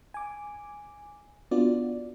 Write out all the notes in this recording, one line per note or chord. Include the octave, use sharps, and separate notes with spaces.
G#5 D6
B3 D4 F4 F#4 D5